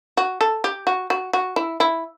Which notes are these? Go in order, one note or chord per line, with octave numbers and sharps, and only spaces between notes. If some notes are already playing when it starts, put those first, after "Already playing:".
F#4
A4
G4
F#4
F#4
F#4
E4
E4